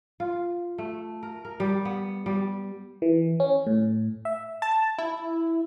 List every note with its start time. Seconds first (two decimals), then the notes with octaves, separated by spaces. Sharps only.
0.20 F4
0.78 A3
1.23 A#4
1.45 A#4
1.60 G3
1.85 B3
2.26 G3
3.02 E3
3.40 C#4
3.67 A2
4.25 E5
4.62 A5
4.98 E4